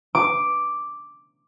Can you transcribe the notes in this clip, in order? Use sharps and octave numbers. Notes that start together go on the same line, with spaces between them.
D6